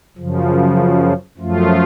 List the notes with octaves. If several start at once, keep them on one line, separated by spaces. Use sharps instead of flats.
F#2 C#3 F3
F#2 F3 A3 F4